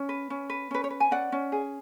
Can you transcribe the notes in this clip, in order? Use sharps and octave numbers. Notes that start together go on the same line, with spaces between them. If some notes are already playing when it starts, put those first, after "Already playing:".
Already playing: C#4
B4
C#4
B4
C#4 B4
C#5
B4
G#5
C#4 D5 F#5
C#4
G#4